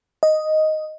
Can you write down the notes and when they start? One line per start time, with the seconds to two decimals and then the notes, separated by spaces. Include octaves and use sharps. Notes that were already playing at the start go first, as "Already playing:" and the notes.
0.23 D#5